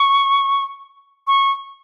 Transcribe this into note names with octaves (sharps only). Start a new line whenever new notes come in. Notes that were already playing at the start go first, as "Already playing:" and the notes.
Already playing: C#6
C#6